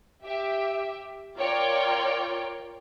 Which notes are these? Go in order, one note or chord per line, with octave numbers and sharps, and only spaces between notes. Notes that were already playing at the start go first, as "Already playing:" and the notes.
G4 E5
F4 A#4 C#5 D5 G5